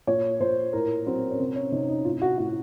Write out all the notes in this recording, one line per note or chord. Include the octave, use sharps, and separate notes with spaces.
A#2 C#5
A#2 C5
A2 A#4
F#3 C4
C#4
C3 C4
C#4
C3 D#4
D#4
A2 F4
F#4
A2 F#4